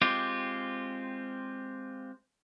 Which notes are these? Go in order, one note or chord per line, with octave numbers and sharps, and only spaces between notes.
G#3 C4 F4 G4